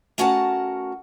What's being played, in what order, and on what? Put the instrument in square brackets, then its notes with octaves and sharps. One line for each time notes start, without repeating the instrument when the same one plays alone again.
[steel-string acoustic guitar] A3 C#4 F#4 A#4 F#5 A5